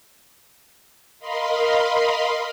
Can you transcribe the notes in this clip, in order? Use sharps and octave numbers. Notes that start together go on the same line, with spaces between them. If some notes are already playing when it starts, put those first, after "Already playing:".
A#4 D#5 F5 B5 C6